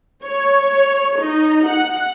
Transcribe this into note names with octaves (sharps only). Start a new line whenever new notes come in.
C#5
D#4
F#5